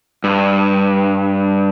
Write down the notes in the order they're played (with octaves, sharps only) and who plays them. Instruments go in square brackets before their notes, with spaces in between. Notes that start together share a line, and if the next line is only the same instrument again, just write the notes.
[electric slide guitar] G2